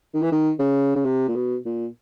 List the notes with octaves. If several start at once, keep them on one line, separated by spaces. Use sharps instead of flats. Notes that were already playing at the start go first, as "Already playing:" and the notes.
D#3
E3
D#3
C#3
C#3
C3
A#2
B2
A#2